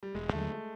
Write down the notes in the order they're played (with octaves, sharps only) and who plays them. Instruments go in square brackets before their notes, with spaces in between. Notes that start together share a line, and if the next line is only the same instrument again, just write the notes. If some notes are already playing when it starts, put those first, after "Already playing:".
[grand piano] G3
[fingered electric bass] E1 [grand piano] G#3
[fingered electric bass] D#2 D3 F#3 [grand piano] A3